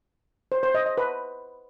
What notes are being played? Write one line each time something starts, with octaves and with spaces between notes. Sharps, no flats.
C5
C5
D#5
D#5
B4